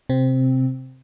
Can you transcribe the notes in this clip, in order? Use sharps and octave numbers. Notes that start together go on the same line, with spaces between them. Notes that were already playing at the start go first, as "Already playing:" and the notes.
C3 C4